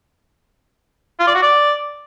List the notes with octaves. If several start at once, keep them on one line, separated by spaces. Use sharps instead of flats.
F4
D5
F#4
D5